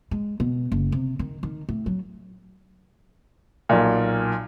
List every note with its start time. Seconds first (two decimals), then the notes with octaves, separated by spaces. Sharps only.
0.11 G#3
0.40 B2
0.72 F#1
0.92 C3
1.19 D#3
1.43 D#3
1.69 A2
1.86 F#3
3.69 B1 A#2